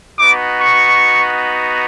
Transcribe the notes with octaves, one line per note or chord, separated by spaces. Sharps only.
B3 D#4 F#4 D6
C#6